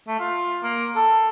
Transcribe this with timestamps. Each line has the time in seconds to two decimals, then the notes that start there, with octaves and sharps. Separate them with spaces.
0.07 A3
0.20 F4
0.63 A#3
0.96 A4